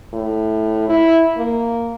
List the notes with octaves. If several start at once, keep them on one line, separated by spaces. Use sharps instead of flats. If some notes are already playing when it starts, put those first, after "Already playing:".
A2
E4
A#3